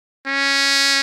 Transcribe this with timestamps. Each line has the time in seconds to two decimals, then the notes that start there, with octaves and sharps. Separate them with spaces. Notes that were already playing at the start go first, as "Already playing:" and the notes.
0.27 C#4